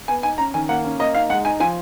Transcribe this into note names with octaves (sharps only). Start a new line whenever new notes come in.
B3 G#5
D#4 G#5
C#4 A#5
D#3 G#5
A#3 F#5
C#4
A#3 D#5
D#4 F5
G#3 F#5
D#4 G#5
F3 G#5